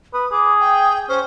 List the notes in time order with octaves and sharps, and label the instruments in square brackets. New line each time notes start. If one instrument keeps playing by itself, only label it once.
[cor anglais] B4 [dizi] D#6
[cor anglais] G#4 [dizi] D6
[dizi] G5
[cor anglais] C#4 [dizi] C5